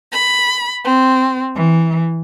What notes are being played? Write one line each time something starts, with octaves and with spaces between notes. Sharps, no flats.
B5
C4
E3